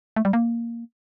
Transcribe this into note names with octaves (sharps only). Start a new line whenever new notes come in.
A3
G3
A#3